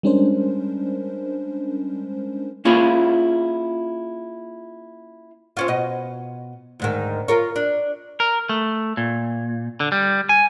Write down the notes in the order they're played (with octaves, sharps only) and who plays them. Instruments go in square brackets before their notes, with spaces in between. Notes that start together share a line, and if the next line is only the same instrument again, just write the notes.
[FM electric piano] G3 G#3 C#4 D4 A#4 C5
[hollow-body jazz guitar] A#3 C#4 E4 F4 G#4
[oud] C4 C#4 F4
B2 D#5
D2 G#2 D#3
F4 A#4 C#5
D4
[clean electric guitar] A#4
A3
A#2
D3
G3
G#5